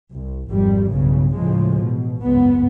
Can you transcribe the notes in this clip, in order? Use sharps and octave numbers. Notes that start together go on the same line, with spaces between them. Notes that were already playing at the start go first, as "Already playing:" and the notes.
C2
G#1 F2 G3
B1 E2 G2 C#3
D2 A2 C#3 F3 G#3
A1 B2
F#1 C#2 G#2 B3